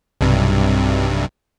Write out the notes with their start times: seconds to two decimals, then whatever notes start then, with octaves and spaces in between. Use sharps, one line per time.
0.21 B1 G2 C3